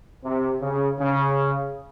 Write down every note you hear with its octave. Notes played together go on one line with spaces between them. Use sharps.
C3
C#3
C#3